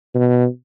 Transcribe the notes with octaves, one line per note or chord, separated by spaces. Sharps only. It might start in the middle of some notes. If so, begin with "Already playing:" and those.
B2